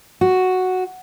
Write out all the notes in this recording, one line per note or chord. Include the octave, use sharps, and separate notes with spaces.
F#4